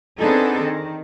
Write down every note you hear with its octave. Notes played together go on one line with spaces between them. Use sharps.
B3 C4 D4 D#4 G#4 A4
D#3